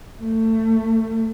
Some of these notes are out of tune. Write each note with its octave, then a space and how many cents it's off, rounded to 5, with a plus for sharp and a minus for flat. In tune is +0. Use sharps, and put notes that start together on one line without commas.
A3 +25